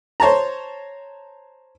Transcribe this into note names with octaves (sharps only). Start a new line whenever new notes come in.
C5 C#5 A5 A#5